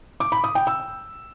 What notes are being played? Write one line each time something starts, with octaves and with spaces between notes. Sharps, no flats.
D6
B5
D#6
G5
E6